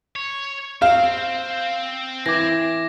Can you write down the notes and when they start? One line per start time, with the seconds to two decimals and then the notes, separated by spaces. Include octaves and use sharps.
0.16 C#5
0.82 C4 F5
2.26 E3 D6 G#6 A#6